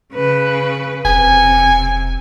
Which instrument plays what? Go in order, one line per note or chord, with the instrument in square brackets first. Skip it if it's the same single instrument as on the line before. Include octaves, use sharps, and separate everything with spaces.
[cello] C#3 B4
[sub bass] E1 [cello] C3 [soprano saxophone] G#5